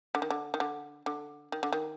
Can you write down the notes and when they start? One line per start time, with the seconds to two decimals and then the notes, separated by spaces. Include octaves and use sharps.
0.15 D3
0.22 D#3
0.30 D3
0.54 D#3
0.60 D3
1.06 D3
1.52 D#3
1.63 D3
1.73 D#3